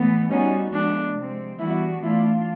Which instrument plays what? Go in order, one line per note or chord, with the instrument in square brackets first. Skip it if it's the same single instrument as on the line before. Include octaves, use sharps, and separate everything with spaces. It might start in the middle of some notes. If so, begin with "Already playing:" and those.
Already playing: [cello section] A2 E3 G#3 B3
[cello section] G3 B3 D#4 F#4 [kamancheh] C#4
[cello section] F3 G#3 B3 [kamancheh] D4
[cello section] C3 F3 G#3 C4
[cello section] E3 G3 B3 D4 F#4 [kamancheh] E4
[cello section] E3 A3 D4 F4 [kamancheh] E4